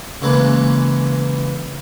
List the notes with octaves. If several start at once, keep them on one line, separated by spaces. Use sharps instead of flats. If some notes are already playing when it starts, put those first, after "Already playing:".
C#3 E3 G#3 A#3 B4